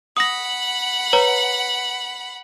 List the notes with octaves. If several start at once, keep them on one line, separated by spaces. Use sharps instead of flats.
F#5 B5 D#6 A#6
B4 C#5 A#5